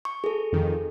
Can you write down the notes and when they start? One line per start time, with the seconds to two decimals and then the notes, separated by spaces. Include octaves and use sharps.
0.05 C#6
0.24 G#4 A4
0.52 F2 D#3